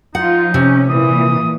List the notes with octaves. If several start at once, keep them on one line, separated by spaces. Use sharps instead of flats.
F3 D#4 F4 F#5
C3 C#4
A#2 E3 D#6